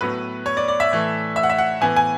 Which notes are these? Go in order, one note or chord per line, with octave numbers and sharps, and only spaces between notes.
A2 F#3 B3 B4
C#5
D5
D5
E5
A2 E3 A3
E5
F#5
E5
F#5
A2 E3 B3 G#5
G#5